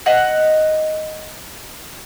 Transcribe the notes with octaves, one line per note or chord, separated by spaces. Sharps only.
D#5 F#5 E6